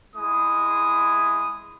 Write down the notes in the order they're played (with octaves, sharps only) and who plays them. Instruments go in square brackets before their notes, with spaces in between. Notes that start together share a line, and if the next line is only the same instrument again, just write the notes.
[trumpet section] G#3 E4 D#6